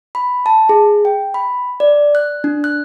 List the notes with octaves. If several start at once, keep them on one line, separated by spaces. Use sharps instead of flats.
B5
A5
G#4
G5
B5
D5
F#6
D4
F#6